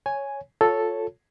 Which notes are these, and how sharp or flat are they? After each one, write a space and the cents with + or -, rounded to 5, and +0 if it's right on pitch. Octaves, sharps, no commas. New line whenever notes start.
C#5 +0 G#5 +0
F4 +25 A4 +0 C#5 +0